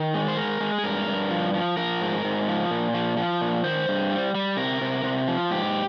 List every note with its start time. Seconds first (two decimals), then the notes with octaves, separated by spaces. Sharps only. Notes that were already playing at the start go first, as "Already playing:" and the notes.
Already playing: D#3
0.14 G#3
0.28 C5
0.37 G#3 A#4
0.61 G#3
0.78 G#4
0.83 G2 A#4
1.07 G2
1.31 F3
1.54 F3
1.77 F3 A#4
2.01 G#2
2.25 G#2
2.48 F3
2.71 A#2
2.94 F3
3.17 F3
3.41 A#2
3.64 D#3 C5
3.88 G2
4.11 G3
4.35 G3
4.57 C3 A#4
4.81 C3
5.04 C3
5.27 F3
5.51 G#2 G4